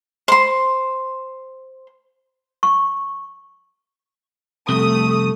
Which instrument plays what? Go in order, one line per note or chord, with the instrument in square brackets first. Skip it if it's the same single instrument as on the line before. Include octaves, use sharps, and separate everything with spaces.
[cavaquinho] C5 C6
[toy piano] C#6
[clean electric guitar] C2 F2 C3 [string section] A3 D#6